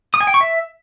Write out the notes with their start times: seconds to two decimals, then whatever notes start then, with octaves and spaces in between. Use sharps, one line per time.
0.14 D#6
0.21 G#5
0.27 G5
0.34 C#6
0.41 E5